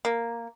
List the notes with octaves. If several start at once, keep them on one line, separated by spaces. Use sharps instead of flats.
A#3